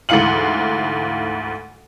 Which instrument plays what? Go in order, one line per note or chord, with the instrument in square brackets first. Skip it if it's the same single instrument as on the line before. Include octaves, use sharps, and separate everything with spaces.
[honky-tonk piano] D2 G#2 E3 F5 C#7 F#7